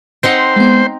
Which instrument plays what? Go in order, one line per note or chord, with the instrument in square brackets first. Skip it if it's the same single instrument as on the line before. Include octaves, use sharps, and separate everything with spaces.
[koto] C4 D#4 F#5 [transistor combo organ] C5
[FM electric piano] G#3 B3